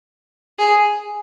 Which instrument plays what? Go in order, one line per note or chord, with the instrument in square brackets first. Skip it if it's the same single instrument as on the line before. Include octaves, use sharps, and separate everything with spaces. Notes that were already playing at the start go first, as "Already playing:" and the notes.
[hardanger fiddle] G#4